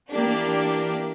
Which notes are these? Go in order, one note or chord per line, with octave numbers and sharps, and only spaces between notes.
E3 A#3 D4 G4